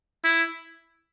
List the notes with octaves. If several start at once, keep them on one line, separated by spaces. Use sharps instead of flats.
E4